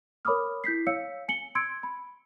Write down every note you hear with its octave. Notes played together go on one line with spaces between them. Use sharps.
A#4 C#5 B5 D6 D#6 F6
E4 G6 B6 C7
C#5 F5 E6 G6 C#7
G#5 C#7 F#7 G7
C6 E6 G#6 C#7 D7
B5